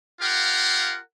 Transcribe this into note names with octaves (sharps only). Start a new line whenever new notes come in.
F4 G4 A#4 F5 F#5